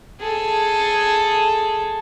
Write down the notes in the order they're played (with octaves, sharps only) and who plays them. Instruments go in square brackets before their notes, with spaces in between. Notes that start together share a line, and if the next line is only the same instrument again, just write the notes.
[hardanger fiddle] G#4 A4